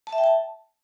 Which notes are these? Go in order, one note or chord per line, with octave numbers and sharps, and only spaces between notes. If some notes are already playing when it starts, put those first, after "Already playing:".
A5
E5
G5
A5